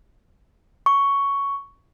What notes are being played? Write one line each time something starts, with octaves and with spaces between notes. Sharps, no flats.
C#6